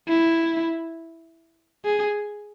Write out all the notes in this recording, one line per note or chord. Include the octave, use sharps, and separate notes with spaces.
E4
G#4